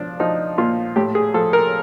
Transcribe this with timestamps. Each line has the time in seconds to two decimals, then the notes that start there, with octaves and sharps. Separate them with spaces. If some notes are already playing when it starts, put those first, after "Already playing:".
Already playing: F3 D4
0.20 F3 D#4
0.58 A#2 F4
0.96 A2 G4
1.15 G#4
1.34 F3 A4
1.53 A#4